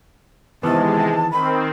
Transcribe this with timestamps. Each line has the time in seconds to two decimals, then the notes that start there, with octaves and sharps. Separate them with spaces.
0.63 C3 D#3 E3 G#3 B3 A5
1.31 D#3 C4 B5